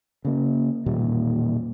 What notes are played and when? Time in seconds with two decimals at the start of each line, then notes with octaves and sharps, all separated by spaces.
0.25 C#3 A#3
0.86 E1 A#2 D#3 G3